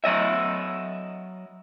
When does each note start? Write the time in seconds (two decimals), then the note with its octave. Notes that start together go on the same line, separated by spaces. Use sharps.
0.04 F#3 D#5 E5